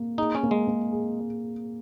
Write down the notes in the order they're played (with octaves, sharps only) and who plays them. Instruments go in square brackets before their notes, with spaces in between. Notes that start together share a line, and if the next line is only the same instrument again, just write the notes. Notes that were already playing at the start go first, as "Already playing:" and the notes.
Already playing: [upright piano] A#3
[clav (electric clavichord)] D#4 [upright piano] G#4
[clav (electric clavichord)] C#4
[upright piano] A#3
[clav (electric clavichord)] G#3
[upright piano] A#3
G#4